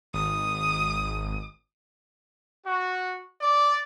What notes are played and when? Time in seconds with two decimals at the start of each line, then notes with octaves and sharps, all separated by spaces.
0.14 G#1 D#6
2.65 F#4
3.41 D5